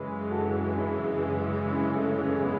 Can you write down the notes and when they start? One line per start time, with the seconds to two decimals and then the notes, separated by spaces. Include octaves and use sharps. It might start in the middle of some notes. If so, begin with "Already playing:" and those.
Already playing: F#2 C#3 E3 G#3 G#4 B4
0.30 F#4 A4
0.77 E4 G#4
1.72 C#4 E4
1.96 A3 C#4
2.20 A3 C#4
2.43 B3